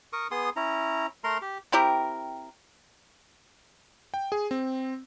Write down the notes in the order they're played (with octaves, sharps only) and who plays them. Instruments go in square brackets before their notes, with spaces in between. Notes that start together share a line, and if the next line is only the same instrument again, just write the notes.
[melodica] A#4 C#6 D#6
B3 G#4 C6 D#6
C#4 E4 A#5
A3 A#4 A#5 C6
G4
[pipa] C4 E4 G4 A#4
[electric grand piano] G5
G#4
C4